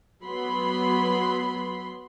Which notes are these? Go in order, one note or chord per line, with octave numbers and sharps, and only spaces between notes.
F#3 B3 B5 C6